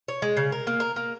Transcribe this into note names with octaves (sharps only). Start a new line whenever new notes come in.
C#5
G#3
C#3
A#4
A#3
A#4
A#3